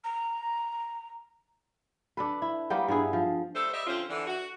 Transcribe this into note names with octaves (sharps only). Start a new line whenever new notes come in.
A#5
D4 A4 B4
E4
G3 A#3 B3 G5
G2 B3 E4 G#4
F3
G3 A3 A4 C5
G3 D#5 E5
D3 F3 C4 C#4 F4
D3 E3
F#4